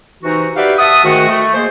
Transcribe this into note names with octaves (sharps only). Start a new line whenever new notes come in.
C3 E3 D#4 F#4
F#4 G4 B4 D5 E5 F5
E5 F#5 A5 D#6
G#2 D#3 A3 F#4
A3
G#3 A#3 G#4 C5